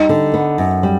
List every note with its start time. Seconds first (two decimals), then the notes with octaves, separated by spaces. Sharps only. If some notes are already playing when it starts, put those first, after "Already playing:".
Already playing: G3 D#4
0.09 D3
0.34 B3
0.58 F#2
0.83 G3